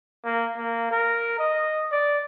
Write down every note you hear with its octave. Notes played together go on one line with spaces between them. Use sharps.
A#3
A#3
A#4
D#5
D5